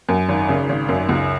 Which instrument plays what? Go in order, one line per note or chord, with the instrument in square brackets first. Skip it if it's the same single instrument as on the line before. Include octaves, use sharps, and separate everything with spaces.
[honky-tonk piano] F#2
G#1
C#3
G#1
F#2
C#2